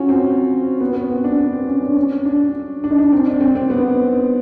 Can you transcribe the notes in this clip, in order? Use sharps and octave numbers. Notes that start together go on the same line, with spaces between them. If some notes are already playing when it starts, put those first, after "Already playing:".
Already playing: C#4 F4 F#4
C4
B3
B3
C4
D4
B3
C4
C#4
D4
C#4
D4
D4
D#4
D4
C4
D4
C4
C4
B3